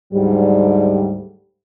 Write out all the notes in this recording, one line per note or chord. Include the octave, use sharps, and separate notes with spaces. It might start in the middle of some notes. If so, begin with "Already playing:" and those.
D2 G#2 F#3 G3